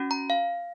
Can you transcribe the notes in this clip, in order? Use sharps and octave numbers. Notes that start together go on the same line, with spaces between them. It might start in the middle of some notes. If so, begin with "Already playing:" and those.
Already playing: C#4 F#4
A#5
F5